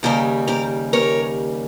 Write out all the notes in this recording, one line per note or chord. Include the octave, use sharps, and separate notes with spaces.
D#2 C#3 G3 G4 A#4
G4 A#4
A#4 C#5